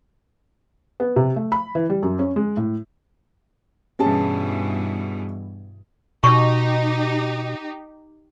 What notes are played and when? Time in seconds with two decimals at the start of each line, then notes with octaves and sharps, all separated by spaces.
1.00 B3
1.16 C3
1.36 A3
1.52 B5
1.75 E3
1.90 G3
2.02 F#2
2.19 C#4
2.36 G#3
2.57 A2
3.99 G2 B2 E3 C#4 G#4 A5
6.24 B2 D#4 G4 C#6